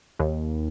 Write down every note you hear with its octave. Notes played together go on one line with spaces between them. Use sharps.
D#2